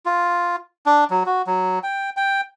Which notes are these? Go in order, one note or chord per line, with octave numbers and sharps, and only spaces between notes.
F4
D4
F#3
F#4
F#3
G5
G5